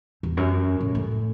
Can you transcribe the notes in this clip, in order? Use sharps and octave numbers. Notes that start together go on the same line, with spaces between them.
E2
F#2
A2
A2